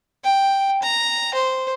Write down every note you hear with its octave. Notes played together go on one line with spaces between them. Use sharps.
G5
A#5
C5